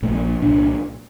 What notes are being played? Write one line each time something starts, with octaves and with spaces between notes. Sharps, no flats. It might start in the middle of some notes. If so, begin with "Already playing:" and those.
A#1 A#2 A3
A#3
C2 A#2 D4